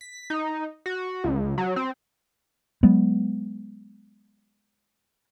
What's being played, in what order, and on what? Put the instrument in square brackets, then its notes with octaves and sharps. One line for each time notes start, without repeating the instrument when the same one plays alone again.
[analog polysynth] B6
D#4
F#4
C#2
F#3
C4
[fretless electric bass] F#3 G#3 B3